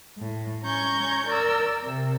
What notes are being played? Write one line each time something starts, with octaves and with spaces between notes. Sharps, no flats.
A2
C#4 A#5 C#6 G6 G#6
A#4 D5 E6
C3